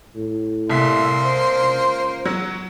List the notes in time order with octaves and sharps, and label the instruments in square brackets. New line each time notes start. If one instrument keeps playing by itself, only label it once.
[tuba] A2
[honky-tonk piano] C2 B6 [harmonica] A#3 C6 [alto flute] E5
[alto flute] C5
[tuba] C#2
[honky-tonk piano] F#3